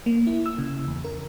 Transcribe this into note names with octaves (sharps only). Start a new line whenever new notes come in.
A#3
E4
E6
C#3
E2
A#4